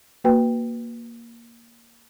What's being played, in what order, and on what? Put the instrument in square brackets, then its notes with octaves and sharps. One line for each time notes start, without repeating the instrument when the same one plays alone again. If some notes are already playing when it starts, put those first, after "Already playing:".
[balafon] A#3 F#4 B4 G5